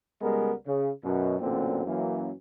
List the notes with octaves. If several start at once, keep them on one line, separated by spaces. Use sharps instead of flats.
C#2 G3 G#3 B3 A#4
C#3
F#2 B2
A1 F#2 A#2 D3 A#3 C4
F#2 E3 A#3